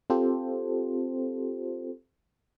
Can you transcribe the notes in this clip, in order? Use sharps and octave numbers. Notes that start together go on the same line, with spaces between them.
C4 F4 G4 A4 C5